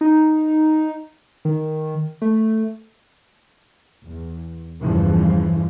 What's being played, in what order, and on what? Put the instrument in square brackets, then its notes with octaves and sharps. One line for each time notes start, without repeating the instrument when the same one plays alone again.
[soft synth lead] D#4
D#3
A3
[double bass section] E2
E2 G2 C#3 E3 F3